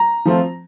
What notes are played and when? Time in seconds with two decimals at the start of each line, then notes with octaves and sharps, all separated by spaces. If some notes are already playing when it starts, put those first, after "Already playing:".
Already playing: A#5
0.25 F3 A3 C4 F4